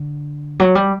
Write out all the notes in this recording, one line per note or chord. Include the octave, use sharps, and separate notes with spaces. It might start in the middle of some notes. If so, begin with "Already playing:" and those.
Already playing: D3
F#3
G3